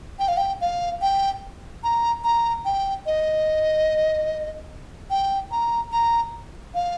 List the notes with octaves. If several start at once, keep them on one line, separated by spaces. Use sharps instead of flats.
G5
F5
G5
F5
G5
A#5
A#5
G5
D#5
G5
A#5
A#5
F5